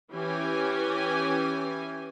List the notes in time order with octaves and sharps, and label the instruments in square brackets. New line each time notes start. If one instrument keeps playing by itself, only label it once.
[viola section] E3 C#4 G4 G#5